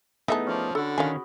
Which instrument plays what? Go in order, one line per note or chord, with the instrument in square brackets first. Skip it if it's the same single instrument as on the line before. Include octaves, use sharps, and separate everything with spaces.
[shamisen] E3 E5 A5 [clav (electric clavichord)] A3 B3 D#4 [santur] G#4
[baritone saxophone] F3 [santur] C#4 C#5 D6
[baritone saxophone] D3 [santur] F#4 B5 [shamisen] A4
[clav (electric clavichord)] D#3 C#4 [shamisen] F5 G#5